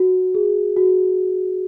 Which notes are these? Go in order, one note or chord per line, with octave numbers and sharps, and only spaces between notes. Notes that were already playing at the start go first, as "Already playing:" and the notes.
Already playing: F#4
G#4
F#4